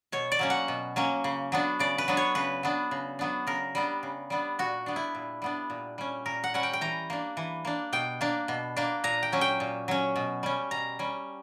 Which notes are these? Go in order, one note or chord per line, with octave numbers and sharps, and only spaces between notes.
B2 C#5
D5
F#3 A#3 C#4
F#5
B2
F#3 A#3 C#4
C#3
F#3 B3 D4
C#3 D5
B4
F#3 B3 D4
C#5
C#3 B4
F#3 B3 D4
C#3
F#3 B3 D4
C#3 A#4
G3 B3 D4
C#3
G3 B3 D4
A#2 F#4
G3 B3 D4
E4
A#2
G3 B3 D4
A#2
G3 C#4
A#2 A#4
F#5
G3 C#4 F#5
G5
G5
E3 A#5
A#3 D4
E3
A#3 D4
B2 G5
A#3 D4
B2
A#3 D4
A#2 A#5
G5
F#3 C#4
G5
A#2
F#3 C#4
B2
G3 C#4
B2 A#5
G3 C#4